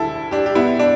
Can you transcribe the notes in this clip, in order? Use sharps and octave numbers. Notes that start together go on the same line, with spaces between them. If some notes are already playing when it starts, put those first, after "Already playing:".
Already playing: D2 D3 G3 E4 A4
D4 G4
G4
B3 E4
D4